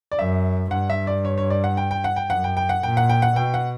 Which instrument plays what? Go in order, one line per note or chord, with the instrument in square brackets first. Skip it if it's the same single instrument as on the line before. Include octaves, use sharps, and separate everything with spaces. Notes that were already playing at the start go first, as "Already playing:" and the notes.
[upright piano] D5
[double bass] F#2 [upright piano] E5
[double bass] G2 [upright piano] F#5
[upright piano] E5
D5
C#5
C#5
D5
F#5
G5
G5
F#5
G5
[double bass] F#2 [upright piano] F#5
[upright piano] G5
G5
F#5
[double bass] A#2 [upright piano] G5
[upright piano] F#5
G5
F#5
[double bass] B2 [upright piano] G5
[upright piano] F#5